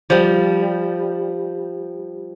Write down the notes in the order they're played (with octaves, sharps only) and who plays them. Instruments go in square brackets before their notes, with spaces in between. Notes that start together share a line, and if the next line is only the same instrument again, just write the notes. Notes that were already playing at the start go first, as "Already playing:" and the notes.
[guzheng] F3 G3